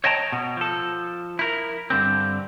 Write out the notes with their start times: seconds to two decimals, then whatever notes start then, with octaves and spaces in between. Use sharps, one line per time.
0.04 C#5 D#5 G5 A5 A#5
0.32 B2
0.57 F3 A4
1.39 E4 A#4
1.90 G2 D3 C4